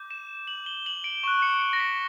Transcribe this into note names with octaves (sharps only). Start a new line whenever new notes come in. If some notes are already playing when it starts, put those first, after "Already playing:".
Already playing: D6 G6
E7
F#7
G7
F#7
D7
C#6 F#6 E7
C#7
C#7
A#6
B6